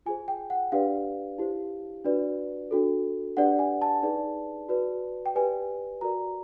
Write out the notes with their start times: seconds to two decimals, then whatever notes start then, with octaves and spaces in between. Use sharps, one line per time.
0.06 F4 G#4 C5 G#5
0.28 G5
0.50 F#5
0.72 D4 G4 B4 D5 F5
1.38 E4 G4 C5
2.04 D4 F#4 B4 D5
2.71 D4 F#4 A4
3.37 D4 G4 B4 D5 F#5
3.59 G#5
3.82 A5
4.03 D#4 G#4 B4 D5
4.69 F#4 B4 D5
5.26 G5
5.35 G4 B4 D5 G#5
6.01 F#4 A#4 D5 A#5